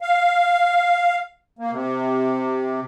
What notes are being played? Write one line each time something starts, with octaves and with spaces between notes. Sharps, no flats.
F5
A#3
C3